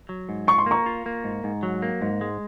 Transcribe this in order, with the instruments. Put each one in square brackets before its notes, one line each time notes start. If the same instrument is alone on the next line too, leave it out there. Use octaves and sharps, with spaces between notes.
[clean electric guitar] F#3
G#2
[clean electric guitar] F4 [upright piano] C#6
[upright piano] C6
[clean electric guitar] A#3 [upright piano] A#5 C#6
[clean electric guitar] F4
A#3
G#2
G#2
F#3
A#3
G#2
G#3